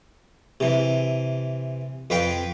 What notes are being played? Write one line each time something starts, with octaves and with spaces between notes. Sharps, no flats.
C3 E3
F2 B4 F5 G5